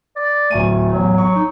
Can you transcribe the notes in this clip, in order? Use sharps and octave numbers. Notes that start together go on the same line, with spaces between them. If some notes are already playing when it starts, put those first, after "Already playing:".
D5
D1 A3 G#5 D#7
A1 E2 F#3
C#6
D#4